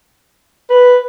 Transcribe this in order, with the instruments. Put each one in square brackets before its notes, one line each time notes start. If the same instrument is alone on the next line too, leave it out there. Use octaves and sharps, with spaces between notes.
[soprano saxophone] B4